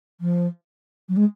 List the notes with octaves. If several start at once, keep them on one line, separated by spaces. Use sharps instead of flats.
F3
F#3
G#3